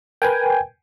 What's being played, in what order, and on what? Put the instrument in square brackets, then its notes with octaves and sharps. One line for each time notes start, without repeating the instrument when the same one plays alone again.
[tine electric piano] A#4 B4 [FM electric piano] G5 G#5